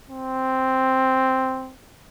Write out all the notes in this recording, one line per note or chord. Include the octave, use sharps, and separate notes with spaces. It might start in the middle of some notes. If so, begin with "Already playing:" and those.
C4